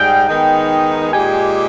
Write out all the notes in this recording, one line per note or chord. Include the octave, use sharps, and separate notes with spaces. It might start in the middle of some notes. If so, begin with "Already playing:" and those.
Already playing: G#2 G3 G#4 G5
D#3 G#3 B3 D#4
A#2 G#3 D#4 G4 G#5